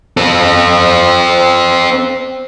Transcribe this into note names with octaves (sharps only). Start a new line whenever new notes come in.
C4 A4